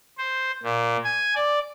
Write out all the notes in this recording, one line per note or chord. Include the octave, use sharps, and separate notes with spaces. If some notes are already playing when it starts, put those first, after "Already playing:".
C5
A#2
G#5
D5